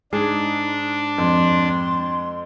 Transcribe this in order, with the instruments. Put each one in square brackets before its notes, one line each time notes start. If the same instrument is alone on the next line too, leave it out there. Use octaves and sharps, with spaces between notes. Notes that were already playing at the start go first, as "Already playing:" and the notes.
[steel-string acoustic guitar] G#2 G#3 [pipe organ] D4 [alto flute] D#4 [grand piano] G#4
[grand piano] F2 [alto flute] C6